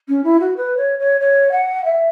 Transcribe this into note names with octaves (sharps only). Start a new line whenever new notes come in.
C#4
E4
F#4
B4
C#5
C#5
C#5
F#5
E5